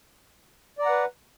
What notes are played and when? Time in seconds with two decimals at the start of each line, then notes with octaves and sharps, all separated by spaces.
0.78 D5
0.82 A#5
0.86 F#5
0.89 B4